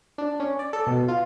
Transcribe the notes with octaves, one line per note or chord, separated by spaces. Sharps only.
D4
C#4
D5
A4
B2
F4